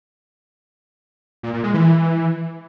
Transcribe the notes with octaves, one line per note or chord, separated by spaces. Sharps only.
A#2
A#2
G#3
E3